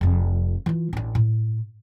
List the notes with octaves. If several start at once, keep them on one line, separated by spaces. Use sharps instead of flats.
F1 F2
E3 F4
A1 D4
A2